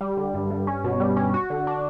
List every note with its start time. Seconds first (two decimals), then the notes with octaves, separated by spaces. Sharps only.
0.01 G3
0.17 D3
0.34 G2
0.50 G2
0.67 C#4
0.84 B2
1.00 G3
1.16 C#4
1.34 F#4
1.50 D3
1.67 D4